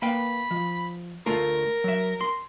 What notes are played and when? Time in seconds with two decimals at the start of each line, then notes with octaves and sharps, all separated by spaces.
0.02 A#3 B4 G5 B5
0.51 F3
1.26 D2 A3 F4 A#4
1.84 F#3 E5
2.21 C6